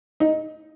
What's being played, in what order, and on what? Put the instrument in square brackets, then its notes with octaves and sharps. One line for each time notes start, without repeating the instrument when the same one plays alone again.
[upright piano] D#4